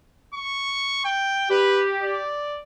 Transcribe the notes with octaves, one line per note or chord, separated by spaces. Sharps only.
C#6
G5
G4 B4
D5